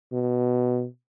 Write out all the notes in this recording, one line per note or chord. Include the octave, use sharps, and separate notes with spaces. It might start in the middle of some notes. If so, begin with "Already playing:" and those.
B2